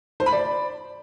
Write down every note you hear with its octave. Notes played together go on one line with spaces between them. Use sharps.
C5
B5
D5